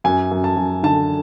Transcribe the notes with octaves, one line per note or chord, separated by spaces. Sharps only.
F#2 G#5
F#2
A5
F#2
D3 A5